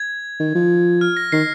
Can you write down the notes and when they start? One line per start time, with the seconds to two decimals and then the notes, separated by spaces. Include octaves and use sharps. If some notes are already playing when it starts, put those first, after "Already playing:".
Already playing: G#6
0.40 D#3
0.55 F3
1.01 F6
1.17 A#6
1.32 D#3 C7